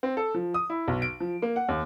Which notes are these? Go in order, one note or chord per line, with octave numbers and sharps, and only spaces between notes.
C4
A4
F3
D#6
E4
B1
D7
F3
A#3
F#5
D#2